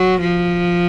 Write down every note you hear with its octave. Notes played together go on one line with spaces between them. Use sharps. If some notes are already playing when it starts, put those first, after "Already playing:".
Already playing: F#3
F3